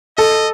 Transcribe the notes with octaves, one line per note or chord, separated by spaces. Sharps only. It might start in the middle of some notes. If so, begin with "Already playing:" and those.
A4 D#5